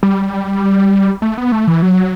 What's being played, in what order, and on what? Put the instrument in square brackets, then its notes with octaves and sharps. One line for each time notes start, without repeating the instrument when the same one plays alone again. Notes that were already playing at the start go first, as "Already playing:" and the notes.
[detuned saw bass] G3
A3
B3
A3
E3
F#3